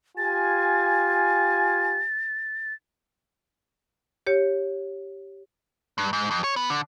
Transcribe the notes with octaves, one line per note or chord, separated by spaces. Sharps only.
F4 G4 G#5 A6
G4 C#5
G2
G#2
F2
C#5
B3
D3